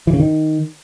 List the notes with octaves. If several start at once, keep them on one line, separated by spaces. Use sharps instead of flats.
E3
C#3
D#3